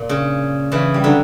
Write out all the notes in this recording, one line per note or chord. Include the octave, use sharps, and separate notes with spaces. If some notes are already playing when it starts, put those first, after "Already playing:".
Already playing: A#2
C#3
C#3 E3
G3
D3 F#3